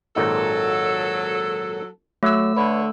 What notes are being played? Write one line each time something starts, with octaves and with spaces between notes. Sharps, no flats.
G#1 A#2 F#3 D#4 A4
F#3 A3 E6
D3 B4 C#5